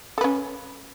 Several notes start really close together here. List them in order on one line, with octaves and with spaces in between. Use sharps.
A4 B4 C#4